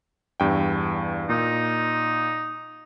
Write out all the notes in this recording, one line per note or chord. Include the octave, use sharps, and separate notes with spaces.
E2 G2 G5
A#2 D#4